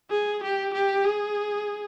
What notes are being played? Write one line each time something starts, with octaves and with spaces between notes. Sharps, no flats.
G#4
G4
G4
G#4